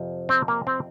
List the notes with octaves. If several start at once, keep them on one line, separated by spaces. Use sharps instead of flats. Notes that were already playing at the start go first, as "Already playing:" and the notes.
Already playing: F2 C3 F3
C4
A#3
C4